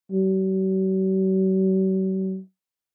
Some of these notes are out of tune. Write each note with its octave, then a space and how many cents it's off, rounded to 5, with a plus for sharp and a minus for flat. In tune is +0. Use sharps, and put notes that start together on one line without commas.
F#3 +45